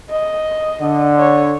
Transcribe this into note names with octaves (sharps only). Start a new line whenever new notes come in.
D#5
D3
C#5